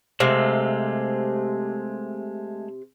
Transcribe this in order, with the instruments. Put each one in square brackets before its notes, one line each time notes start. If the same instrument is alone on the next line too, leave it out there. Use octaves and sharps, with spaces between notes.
[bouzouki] C3 [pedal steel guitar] G#3 A3 F5